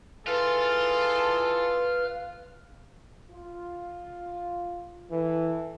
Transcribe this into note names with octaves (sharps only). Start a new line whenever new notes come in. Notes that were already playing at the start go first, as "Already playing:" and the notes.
E3 F4 G#4 A4 B4 F6
F4
E3 A4